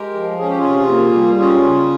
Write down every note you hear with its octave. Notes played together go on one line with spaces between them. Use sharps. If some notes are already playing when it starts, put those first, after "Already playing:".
Already playing: G#3 G4 A#4
F3
C#4 G#4
G4
F4 G#4
C3
A#3
G3
C#4 F4 G#4
C#3